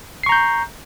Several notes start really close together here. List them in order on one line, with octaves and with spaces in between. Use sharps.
C7 C#6 A#5 G6